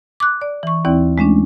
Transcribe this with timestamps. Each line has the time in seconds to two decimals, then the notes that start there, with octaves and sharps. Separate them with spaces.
0.20 D6 F#6
0.41 D5
0.63 E3 C#6
0.85 D#2 E3 C4 E4 D5
1.18 G#3 A3 C#4 D4